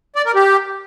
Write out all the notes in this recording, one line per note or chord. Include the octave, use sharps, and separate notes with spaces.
D5
A#4
G4